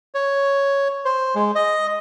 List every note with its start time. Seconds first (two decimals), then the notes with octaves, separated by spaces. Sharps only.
0.14 C#5
1.05 C5
1.35 G#3
1.55 D#5